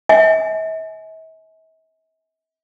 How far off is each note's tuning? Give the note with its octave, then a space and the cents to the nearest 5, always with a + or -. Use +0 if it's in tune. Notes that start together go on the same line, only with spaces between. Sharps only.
E5 -45 G#5 +25